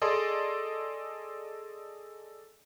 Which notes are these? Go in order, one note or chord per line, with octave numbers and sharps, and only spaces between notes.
G#4 A4 D5 D#5 C6